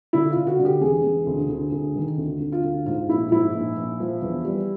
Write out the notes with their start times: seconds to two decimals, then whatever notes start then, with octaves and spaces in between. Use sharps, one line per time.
0.13 D3 E4
0.31 F4
0.36 D3
0.47 F#4
0.59 D3
0.65 G4
0.81 E1 G#4
1.04 E1
1.26 D2
1.49 D2
1.72 D2
1.96 D#3
2.17 D2
2.40 D2
2.52 F4
2.64 D2
2.86 G#2 F4
3.08 A#1 E4
3.31 G#2 E4
3.54 A#1
3.77 A#1
4.00 F3
4.22 E2
4.45 G3